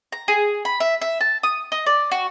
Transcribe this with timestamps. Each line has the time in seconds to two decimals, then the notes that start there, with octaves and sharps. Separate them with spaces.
0.12 A#5
0.28 G#4
0.65 B5
0.80 E5
1.01 E5
1.21 A5
1.43 D#6
1.72 D#5
1.86 D5
2.11 F#4